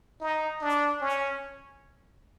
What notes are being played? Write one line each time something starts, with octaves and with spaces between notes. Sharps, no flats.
D#4
D4
C#4